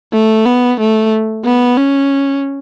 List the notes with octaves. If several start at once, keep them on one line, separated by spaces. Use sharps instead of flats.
A3
B3
A3
B3
C#4